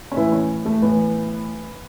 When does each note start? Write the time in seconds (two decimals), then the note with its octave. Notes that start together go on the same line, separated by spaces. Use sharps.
0.12 C#4
0.16 A2 E3 E4
0.32 C#4
0.65 A3
0.82 A2 E3 B3